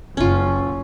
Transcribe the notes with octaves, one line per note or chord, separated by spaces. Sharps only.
F#1 C#4 F4